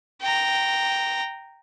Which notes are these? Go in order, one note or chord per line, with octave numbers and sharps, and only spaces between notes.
G5 A#5